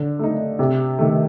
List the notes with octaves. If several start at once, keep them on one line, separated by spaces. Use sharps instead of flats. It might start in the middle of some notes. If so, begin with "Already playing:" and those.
Already playing: D3
A3 D#4
C3
D#3 A3